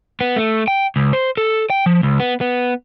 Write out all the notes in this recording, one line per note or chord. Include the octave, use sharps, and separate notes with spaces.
B3
A3
G5
C#2
C5
A4
G5
F3
C#2
B3
B3